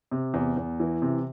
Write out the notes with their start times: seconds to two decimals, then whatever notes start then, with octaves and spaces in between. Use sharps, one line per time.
0.11 C3
0.34 E2
0.57 E2
0.80 E3
1.02 C3